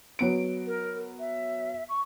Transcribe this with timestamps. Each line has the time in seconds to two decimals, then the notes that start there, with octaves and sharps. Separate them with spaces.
0.19 F#3 B3 D7
0.66 A#4
1.19 E5
1.89 C#6